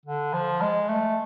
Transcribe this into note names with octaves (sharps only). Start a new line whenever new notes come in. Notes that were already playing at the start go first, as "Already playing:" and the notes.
D3
F3
G#3
A3